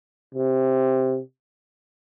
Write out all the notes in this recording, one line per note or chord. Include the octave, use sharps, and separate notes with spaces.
C3